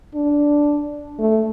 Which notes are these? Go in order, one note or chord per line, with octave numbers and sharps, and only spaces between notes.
D4
A3